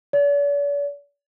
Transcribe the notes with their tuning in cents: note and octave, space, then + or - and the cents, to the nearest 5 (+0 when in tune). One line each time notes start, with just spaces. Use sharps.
D5 -45